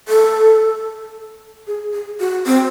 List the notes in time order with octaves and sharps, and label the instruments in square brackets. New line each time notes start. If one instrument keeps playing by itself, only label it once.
[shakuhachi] A4
G#4
G#4
F#4
C4